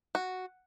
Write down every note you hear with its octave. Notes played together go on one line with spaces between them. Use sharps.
F#4